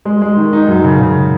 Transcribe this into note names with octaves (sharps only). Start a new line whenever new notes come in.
G#3
G#3
D#3
D#4
F#2
C#3
C#3